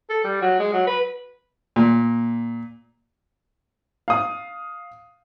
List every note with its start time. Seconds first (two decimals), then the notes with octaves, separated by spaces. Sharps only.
0.10 A4
0.24 G3
0.42 F#3
0.59 G#3
0.73 F#3
0.87 B4
1.76 A#2
4.08 F5 D#6